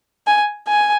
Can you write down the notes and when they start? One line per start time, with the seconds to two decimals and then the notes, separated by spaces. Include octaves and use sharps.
0.27 G#5
0.68 G#5